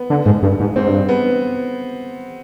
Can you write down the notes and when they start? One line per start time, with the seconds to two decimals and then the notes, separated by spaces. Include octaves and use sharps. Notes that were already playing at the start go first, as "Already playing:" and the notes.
Already playing: B3
0.10 D3
0.26 G#2
0.43 G2
0.60 G#2
0.76 G#2 C4
0.88 G2
1.09 B3